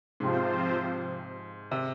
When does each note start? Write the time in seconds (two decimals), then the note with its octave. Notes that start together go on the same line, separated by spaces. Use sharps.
0.20 G#2 C3 F3 C4 F4 C5
1.71 C3